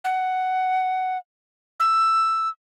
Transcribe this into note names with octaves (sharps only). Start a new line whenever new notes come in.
F#5
E6